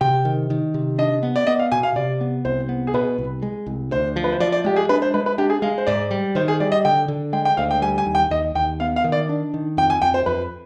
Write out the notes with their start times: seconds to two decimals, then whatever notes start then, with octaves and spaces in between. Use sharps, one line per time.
0.01 C3 G5
0.25 D#3
0.50 D#3
0.74 C3
0.98 D4 D#5
1.23 B3
1.36 D5
1.47 B3 D#5
1.59 F5
1.72 B2 G#5
1.83 F5
1.96 C3 D5
2.21 B3
2.45 C2 C5
2.69 B3
2.87 G#4
2.94 B2 B4
3.18 C2
3.42 G#3
3.66 C2
3.91 D2 C5
4.16 F3
4.24 B4
4.32 C5
4.40 F3 D5
4.52 D5
4.65 G#3 G4
4.76 G#4
4.89 D4 B4
5.02 C5
5.14 G#3 B4
5.26 B4
5.38 D4 G4
5.50 G#4
5.62 G#3 F5
5.78 C5
5.87 G#2 D5
6.11 G3
6.35 D#3 C5
6.48 G#4
6.60 G3 D5
6.72 D#5
6.85 D3 G5
7.08 D3
7.33 G#3 G5
7.45 G5
7.57 D2 F5
7.71 G5
7.82 G3 G#5
7.98 G#5
8.06 D#2
8.15 G5
8.30 D#2 D#5
8.55 D#2 G5
8.80 B3 F5
8.96 F5
9.04 D#3
9.12 D5
9.29 D4
9.54 D#3
9.77 F2 G5
9.90 G#5
10.02 F2 G5
10.14 C5
10.26 F2 B4